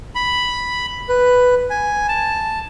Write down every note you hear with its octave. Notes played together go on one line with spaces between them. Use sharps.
B5
B4
G#5
A5